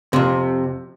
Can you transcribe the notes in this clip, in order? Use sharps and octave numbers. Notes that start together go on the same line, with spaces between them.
F2 C3